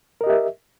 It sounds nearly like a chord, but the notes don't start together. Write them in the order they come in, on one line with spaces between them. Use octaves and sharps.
A#4 D#5 G4 E5